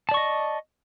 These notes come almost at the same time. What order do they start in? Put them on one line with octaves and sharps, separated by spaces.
A5 D5 C#6 D#5